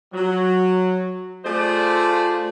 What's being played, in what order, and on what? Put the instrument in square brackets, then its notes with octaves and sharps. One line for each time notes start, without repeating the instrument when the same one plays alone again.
[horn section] F#3
A3 F4 G#4 C5 D5